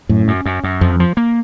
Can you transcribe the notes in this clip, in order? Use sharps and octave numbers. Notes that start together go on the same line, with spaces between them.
F#2 A2
F#2
F#2
F#2
F2 F3
F3
A#3